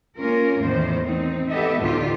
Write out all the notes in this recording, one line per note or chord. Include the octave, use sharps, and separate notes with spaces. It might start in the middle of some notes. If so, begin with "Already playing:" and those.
A#3 C#4 F4 A#4
E2 A2 D#3 E3 C5
C4 D#4
B3 G4 A4 D#5 E5
D2 A2 D3 D#4 F4 G4